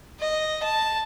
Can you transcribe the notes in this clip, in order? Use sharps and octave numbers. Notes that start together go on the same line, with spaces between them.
D#5
A5